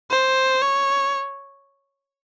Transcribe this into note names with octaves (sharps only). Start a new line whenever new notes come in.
C5
C#5